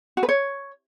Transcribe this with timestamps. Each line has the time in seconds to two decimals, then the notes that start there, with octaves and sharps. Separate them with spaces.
0.17 F#4
0.23 B4
0.29 C#5